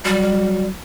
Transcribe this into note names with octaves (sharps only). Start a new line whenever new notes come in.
F#3 G3